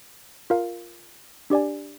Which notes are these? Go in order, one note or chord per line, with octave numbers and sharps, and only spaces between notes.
F4 A#4 F5
D4 G4 D5 G#5